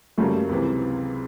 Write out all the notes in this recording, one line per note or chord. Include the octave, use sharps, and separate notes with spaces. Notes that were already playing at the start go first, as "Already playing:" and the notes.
F#2 C#3 F#3 G3 A3 A#3
C#2 C3 E3